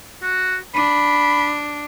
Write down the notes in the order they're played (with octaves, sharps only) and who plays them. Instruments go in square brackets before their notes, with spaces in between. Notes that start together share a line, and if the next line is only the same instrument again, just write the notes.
[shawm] F#4
[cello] D4 [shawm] B5